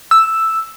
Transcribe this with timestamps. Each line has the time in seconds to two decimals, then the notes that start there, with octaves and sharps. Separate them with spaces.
0.11 E6